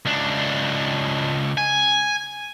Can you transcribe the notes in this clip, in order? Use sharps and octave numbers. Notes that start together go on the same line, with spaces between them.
C#2 D4
G#5